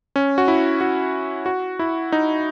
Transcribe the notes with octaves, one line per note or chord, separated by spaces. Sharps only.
C#4
F#4
E4
F#4
F#4
E4
D#4